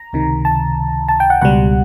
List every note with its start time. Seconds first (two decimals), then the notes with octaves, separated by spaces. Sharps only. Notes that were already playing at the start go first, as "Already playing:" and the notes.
Already playing: A#5
0.13 C#2 C3 D#3
0.45 A5
1.08 A5
1.20 G5
1.30 F#5
1.42 C#2 B2 G3 F#5